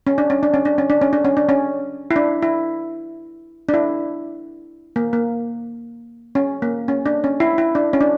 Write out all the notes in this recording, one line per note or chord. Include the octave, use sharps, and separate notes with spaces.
C#4
D4
C#4
D4
C#4
D4
C#4
D4
C#4
D4
C#4
D4
C#4
E4
D4
E4
D4
E4
A#3
A#3
C#4
A#3
C#4
D4
C#4
E4
E4
D4
C#4
D4